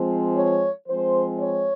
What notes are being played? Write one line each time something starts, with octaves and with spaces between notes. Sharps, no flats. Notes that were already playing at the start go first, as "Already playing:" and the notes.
Already playing: F3 G#3 C4
C#5
F3 G#3 C4 C5
C#5